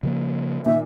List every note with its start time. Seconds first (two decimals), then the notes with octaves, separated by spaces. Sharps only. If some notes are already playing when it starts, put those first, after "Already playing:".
0.03 C#3 F3 A#3
0.66 A#2 D#3 E5